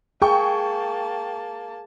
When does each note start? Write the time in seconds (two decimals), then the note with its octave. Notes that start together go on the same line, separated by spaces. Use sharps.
0.22 A#3 G#4 G5 A5 C#6